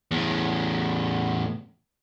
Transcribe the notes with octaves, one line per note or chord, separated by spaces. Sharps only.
E2 A2